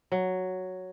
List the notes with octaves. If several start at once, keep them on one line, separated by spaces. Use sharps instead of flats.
F#3